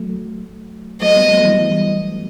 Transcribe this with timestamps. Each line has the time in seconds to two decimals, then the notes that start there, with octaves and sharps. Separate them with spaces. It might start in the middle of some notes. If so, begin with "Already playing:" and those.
Already playing: F#3 A3
1.01 F#3 A3 D#5
1.16 G3 B3
1.31 F#3 A3
1.45 E3 G3